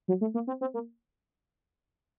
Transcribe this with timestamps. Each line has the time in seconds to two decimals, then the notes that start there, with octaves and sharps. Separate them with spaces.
0.08 F#3
0.21 A3
0.34 A#3
0.47 C4
0.61 C4
0.74 A#3